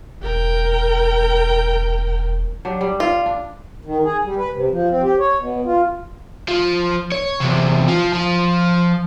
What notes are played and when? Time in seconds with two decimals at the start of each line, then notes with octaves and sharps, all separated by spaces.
0.23 E1 A#4 G5
2.65 F#3 D4 G4
2.81 G3
3.00 F4
3.26 D4
3.85 D#3
4.04 G#4
4.24 G3
4.37 B4
4.53 C3
4.71 F3
4.90 C4
5.02 G4
5.19 C#5
5.39 B2
5.66 F4
6.48 F3
7.12 C#5
7.41 E2 C3
7.88 F3
8.13 F3